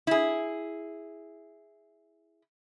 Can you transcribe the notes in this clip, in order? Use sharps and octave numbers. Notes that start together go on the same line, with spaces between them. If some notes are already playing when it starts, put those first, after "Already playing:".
E4 G#4